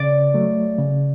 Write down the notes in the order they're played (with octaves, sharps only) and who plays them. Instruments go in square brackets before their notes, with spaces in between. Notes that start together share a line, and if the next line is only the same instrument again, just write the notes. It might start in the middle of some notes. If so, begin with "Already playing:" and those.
Already playing: [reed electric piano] C#3 [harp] D5
[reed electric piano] F#3 A3
C#3